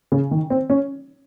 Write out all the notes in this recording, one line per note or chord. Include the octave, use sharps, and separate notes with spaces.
C#3
D#3
C4
C#4